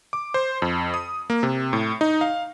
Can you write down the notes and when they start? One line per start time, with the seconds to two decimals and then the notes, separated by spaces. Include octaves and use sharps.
0.13 D6
0.34 C5
0.62 F2
0.94 D#6
1.30 A#3
1.43 C3
1.73 A2
2.01 D#4
2.21 F5